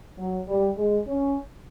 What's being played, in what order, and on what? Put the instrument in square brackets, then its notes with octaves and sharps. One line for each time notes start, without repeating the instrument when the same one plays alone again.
[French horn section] F#3
G3
G#3
C#4